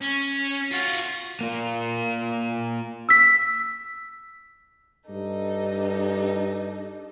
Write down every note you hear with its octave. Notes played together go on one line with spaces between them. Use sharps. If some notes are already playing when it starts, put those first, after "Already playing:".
C#4
F4 F#4
A#3 F4
E6 B6
G2 D4 D#4 A4